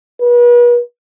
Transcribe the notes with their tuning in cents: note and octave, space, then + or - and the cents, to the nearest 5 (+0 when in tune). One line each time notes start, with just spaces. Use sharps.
B4 -40